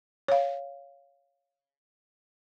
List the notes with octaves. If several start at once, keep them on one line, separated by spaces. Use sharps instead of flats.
C#5 F5